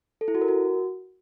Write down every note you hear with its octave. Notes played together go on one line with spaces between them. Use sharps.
A4
E4
F#4
A#4
F#4